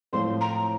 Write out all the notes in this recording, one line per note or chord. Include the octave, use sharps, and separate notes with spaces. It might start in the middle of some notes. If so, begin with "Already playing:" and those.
A2 F3 A3 C4 C6
A#5